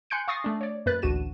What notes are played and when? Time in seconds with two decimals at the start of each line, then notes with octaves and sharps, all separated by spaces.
0.10 G#5 C6 F#6 G6 C#7 D7
0.28 F5 C#6 D#6 A6 A#6 C7
0.44 A3 D4
0.61 C#5 D5
0.86 F#2 A#3 B4 F#6 A6
1.02 A1 D2 D4 F#4 D#7 E7